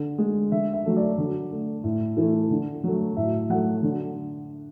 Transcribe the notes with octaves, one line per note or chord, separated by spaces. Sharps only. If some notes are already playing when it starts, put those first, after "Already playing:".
Already playing: D3
G#3
D3 E5
E5
F#3 A3
D5
D3
A3
A2
E3 A3
D3
F#3 A3
A2 E5
F#3 A3 F#5
D3